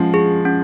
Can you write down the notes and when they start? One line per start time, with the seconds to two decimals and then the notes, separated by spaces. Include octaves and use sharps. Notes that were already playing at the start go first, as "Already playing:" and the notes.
Already playing: F3 G#3 C#4
0.14 G#4
0.45 C#4